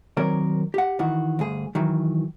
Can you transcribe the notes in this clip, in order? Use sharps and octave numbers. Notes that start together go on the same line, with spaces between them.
D#3 F#3 C4 A#4 C#5 D5
G4 F#5
D#3 E3 F#4
D2 G2 G#4
D#3 E3 F#3